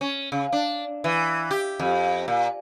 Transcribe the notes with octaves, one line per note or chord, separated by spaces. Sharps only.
C#4
C#3
D4
E3
G4
F2
A#2